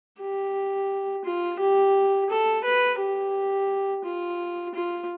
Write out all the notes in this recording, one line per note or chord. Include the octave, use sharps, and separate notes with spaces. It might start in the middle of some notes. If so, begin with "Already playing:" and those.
G4
F4
G4
A4
B4
G4
F4
F4